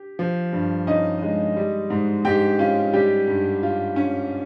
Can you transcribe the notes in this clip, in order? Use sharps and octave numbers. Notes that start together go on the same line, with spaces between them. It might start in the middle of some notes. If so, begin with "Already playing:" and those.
Already playing: G4
F3
G2
C#4 D#4 D#5
G#3
G3
G#2
G#2 G4 G5
C#4 F4 F5
G3 G4 G5
G2
F4
C#4